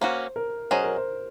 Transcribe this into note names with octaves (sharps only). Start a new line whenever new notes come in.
A#3 C#4 F#4 C5
A#4
F#3 C#4 G#4 C5 D#5
A#4
C5